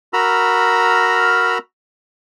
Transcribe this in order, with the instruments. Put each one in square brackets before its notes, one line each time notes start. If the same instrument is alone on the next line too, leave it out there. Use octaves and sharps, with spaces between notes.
[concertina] F#4 A#4 A#5 B5 E6 F6